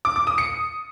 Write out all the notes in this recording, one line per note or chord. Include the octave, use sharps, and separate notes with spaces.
D6
D6
D#6
C#7